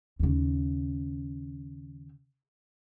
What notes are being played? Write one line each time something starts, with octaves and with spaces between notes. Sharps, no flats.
D#2 C#3